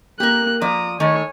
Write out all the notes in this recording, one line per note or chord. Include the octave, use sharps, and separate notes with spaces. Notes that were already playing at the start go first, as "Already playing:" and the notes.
A#3 G4 A#4 F#6
F3 D5 A#5 D#6
D#3 A3 C#5 G#5